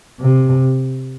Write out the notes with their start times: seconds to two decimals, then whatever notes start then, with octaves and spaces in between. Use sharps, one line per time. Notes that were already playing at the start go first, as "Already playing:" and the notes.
0.20 C3